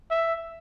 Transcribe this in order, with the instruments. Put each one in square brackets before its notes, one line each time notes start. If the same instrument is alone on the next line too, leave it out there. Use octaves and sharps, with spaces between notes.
[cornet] E5